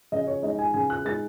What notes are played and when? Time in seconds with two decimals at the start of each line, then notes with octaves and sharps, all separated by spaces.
0.12 C#3 D#5
0.27 C#5
0.43 G#3 D#4 D#5
0.59 G#5
0.74 C#3 G#5
0.90 F#6
1.05 G#3 D#4 A6